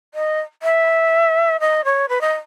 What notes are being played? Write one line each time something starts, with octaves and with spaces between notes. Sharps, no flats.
D#5
E5
D#5
C#5
B4
D#5